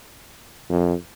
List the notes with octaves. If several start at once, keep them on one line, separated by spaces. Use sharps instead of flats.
F2